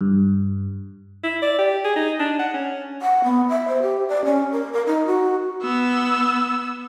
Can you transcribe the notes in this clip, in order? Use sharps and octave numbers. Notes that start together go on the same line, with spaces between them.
G2
E4
D5
G4
G#4
D#4
D4
F#5
C#4
F#5
B3
E5
C5
G4
D5
C#4
A#4
A#4
D#4
F#4
B3 E6